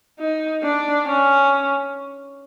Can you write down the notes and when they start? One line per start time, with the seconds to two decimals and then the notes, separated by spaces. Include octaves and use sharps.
0.19 D#4
0.63 D4
1.06 C#4